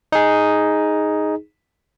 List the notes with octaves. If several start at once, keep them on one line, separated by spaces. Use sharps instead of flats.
D#4 G#4